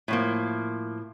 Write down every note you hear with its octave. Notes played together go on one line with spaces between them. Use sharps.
A2 F3 A#3